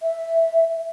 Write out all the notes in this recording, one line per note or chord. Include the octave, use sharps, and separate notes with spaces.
E5